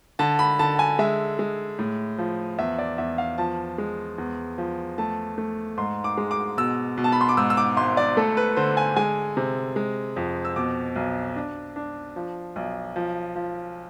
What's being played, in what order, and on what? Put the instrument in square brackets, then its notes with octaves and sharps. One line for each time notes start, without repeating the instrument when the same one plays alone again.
[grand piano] D3 A5
B5
D3 A5
G#5
G#3 E5
G#3
A2
F3
E2 E5
D5
E2 E5
F5
F3 A5
G#3
E2
F3
A3 A5
A3
G#2 C6
D6
G#3
D6
B2 E6
B2
A5
B5
C6
D6
G#2 E6
E6
D6
G#1 C6
D5
A3 A4
B4
D3 C5
G#5
G#3 G#5
C3
G#3
F2
E6
B2 D6
B1
D4
D4
F3
B1
F3
F3